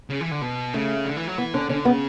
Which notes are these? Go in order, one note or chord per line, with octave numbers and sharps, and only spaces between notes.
C#3
E3
D3
B2
C#3 A3
D3
E3
F#3
E3 B3
D3 C#4
D3 C#4
C#3 B3